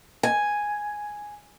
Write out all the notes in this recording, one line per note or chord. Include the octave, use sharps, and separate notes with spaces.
G#5